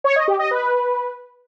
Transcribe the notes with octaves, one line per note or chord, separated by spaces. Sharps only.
C#5
D#5
G4
D#5
B4